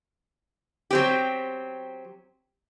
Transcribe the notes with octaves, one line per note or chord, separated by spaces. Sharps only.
F#3 C4 G4